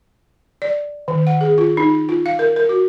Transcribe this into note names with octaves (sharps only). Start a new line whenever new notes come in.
D5
D#3
F#5
G#4
F4
D#4
F4
F5
A#4
A#4
F#4